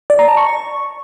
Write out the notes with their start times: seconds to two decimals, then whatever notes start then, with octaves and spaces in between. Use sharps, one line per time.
0.10 D5
0.19 A#5
0.28 A5
0.37 C#6